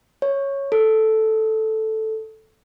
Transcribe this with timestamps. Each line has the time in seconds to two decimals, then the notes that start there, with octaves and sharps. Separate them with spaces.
0.22 C#5
0.72 A4